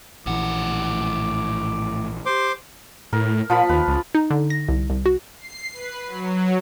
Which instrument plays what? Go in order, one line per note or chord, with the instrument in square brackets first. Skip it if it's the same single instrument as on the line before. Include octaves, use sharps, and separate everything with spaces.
[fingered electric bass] A#1 E3 [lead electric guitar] A2 F#5 [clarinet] D6
[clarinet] G4 [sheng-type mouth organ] C5 C6 D6
[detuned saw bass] A2 [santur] A#4
[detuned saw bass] A#2 [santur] F3 F4 B5
[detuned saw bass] D#2 [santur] B4
[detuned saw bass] C#2
[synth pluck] D#4
D3
A#6
C2
C2
F#4
[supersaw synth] C7
B4
F#3